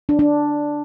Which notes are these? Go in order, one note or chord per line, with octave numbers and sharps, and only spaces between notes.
D4
D4